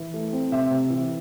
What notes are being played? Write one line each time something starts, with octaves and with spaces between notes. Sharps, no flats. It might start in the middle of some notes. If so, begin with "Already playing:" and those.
Already playing: E3
A3
C4
C3 E5
C3
E3